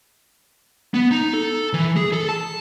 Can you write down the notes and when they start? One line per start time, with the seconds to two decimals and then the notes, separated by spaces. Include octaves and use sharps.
0.94 B3
1.11 D#4
1.33 A4
1.73 E3
1.96 G#4
2.12 A4
2.29 A5